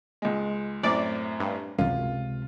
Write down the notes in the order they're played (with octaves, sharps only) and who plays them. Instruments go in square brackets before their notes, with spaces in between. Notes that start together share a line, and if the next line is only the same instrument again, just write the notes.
[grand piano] C#2 G#3
[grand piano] F#2 A2 C4 [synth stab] D5
[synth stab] G2
[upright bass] C#2 C3 [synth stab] F#2 [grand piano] F4